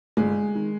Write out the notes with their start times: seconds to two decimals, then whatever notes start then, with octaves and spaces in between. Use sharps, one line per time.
0.17 G1 G#3
0.55 D#3